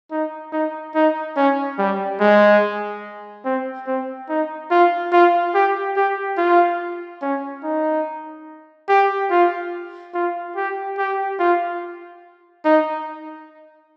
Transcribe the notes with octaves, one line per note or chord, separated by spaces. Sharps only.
D#4
D#4
D#4
C#4
G3
G#3
C4
C4
D#4
F4
F4
G4
G4
F4
C#4
D#4
G4
F4
F4
G4
G4
F4
D#4